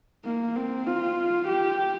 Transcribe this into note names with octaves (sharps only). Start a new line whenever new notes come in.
A#3
C4
F4
G4